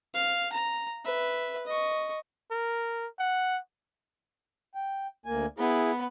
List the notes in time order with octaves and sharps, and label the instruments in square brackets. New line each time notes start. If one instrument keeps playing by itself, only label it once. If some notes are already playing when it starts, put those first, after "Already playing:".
[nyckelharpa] F5
A#5
B4 E5
D#5 C#6
[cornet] A#4
F#5
[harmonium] G5
D2 A#3 G#5
[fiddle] B3 [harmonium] E4 G#4